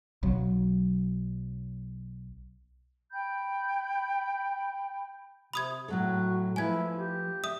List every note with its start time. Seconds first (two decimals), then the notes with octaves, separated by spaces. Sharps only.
0.23 B1 F#3
3.12 G5 B5 G6
5.53 C3 B5 D#6 G#6
5.88 A2 F#3 F#4 A4
6.56 F3 A3 E4 B4 G#5 G#6
6.97 G4
7.44 E5 D#6